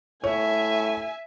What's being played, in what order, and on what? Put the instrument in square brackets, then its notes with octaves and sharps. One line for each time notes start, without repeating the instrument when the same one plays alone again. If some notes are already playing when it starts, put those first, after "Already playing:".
[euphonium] A2 [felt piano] C#5 [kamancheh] E5 G#5